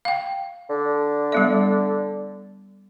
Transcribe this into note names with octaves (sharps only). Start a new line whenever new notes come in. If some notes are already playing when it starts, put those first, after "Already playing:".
F5 G5
D3
G3 B3 E5